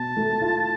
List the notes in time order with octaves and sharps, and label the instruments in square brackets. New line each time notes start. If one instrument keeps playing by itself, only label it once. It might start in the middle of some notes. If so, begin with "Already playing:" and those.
Already playing: [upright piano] B2 [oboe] A5
[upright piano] A3
F4